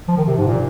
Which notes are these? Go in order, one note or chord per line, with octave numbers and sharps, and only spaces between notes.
F3
D#3
C3
G#2
A#2